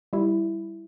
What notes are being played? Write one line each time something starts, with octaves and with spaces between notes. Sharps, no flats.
G3 E4